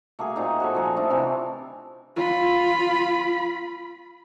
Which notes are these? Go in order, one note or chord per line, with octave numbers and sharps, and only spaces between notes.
A3 A#3 F#4 G#4
A#2 C4 D#4 F5
F#4 G#4 A4
F3 G#4 A#5
F3 A3 D4 E4
C3 E3 C4
F4 B5